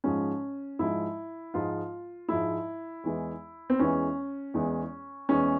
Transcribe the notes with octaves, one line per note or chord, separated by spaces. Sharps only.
G#2 F3 G#3 C#4
G#2 F3 G#3 E4
G#2 F3 G#3 F4
G#2 F3 G#3 E4
E2 E3 G#3
C4
E2 E3 G#3 C#4
E2 E3 G#3
E2 E3 G#3 C#4